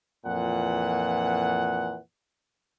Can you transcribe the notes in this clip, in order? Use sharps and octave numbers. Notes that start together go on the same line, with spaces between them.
F2 A#2 E3 F#5